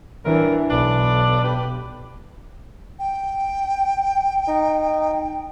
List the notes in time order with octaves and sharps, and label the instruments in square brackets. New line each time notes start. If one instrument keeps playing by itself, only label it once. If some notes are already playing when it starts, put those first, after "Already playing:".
[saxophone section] G2 F#3 A#4 [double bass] E3 D4
[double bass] B1 [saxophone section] D4 B4 D5
[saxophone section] G4 B4
[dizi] G5
[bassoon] D#4